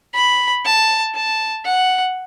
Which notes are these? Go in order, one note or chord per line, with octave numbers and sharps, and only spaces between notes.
B5
A5
A5
F#5